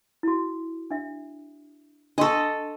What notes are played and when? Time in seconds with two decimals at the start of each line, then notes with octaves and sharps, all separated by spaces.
0.23 E4 F#4
0.91 D4 E5
2.18 D4 A4 D#5 C6 C#6